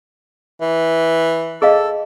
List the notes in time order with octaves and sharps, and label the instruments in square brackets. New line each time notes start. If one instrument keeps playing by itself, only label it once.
[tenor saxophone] E3
[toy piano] G#4 D#5 F5 [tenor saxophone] A4